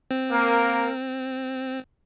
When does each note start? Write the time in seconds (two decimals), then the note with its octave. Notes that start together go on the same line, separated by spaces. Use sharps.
0.11 C4
0.31 A#3 A#4